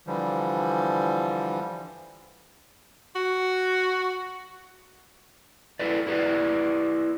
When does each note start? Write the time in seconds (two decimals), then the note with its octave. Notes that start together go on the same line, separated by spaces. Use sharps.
0.07 D3 E3 F3 G3
3.15 F#4
5.79 E4 A4 B4 D5
6.07 E4 G4 A4 B4 D5